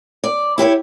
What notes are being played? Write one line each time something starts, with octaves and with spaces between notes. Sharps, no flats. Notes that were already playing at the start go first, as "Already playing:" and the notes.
D5
E4 G4 C5 C#5